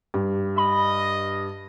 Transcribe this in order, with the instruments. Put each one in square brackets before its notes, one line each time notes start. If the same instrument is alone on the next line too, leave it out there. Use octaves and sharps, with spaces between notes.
[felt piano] G2
[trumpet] D#5 [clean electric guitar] B5